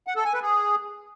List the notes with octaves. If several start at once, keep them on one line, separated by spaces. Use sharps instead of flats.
F#5
A4
G#5
B4
G#4